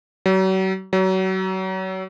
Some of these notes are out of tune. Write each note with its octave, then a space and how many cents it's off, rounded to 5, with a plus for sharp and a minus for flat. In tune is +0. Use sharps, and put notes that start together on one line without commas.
F#3 +40
F#3 +30